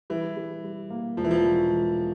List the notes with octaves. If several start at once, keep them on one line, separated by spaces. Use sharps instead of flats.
E3 G3
G3
G3
A#3
E1 F3
E3
F3
B2
E1